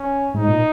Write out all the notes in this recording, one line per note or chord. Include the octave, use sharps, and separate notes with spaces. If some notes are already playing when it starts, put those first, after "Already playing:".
Already playing: C#4
G#2 D#4
A#2